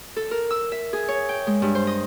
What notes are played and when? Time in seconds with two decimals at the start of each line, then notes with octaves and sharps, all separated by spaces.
0.16 A4
0.31 A#4
0.50 E6
0.72 E5
0.93 G#4
1.08 C#5
1.29 G5
1.47 G#3
1.62 G2
1.75 C5
1.87 D#5